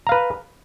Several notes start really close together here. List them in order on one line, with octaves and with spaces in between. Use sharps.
A#5 F5 B4